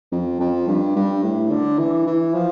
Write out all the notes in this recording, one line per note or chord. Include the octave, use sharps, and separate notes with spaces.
F2
F2
G2
G2
A2
D3
E3
E3
F3